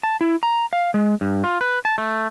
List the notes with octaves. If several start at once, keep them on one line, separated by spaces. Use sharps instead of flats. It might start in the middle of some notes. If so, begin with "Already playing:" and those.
A5
E4
A#5
F5
G#3
G2
F4
B4
A5
A3